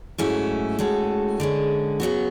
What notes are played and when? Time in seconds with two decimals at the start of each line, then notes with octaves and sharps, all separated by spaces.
0.18 G#2 F#3 A3 C#4 E4
0.79 A2 G#3 C#4 F#4 A4
1.40 D3 G#3 C#4
2.00 C#3 F#3 B3 F#4